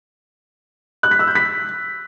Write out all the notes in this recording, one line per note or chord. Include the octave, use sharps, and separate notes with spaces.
F#6
B6
E6
G6
B6